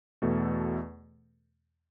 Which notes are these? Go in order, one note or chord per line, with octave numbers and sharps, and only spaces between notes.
E2 B2 A3 A4